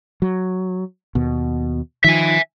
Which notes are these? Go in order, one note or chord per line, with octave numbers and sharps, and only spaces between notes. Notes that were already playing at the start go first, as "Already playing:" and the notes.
F#3
D#2 B2
D#3 F3 E5 G#5